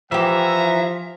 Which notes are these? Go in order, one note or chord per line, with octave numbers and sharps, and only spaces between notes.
E3 F3 G4 E5 F#5 G#5 A#5